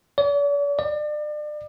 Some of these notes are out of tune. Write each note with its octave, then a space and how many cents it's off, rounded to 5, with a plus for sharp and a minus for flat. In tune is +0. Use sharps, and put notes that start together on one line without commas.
D5 -45
D5 +35